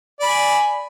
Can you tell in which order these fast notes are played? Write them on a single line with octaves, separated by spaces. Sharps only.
D5 B5 G#5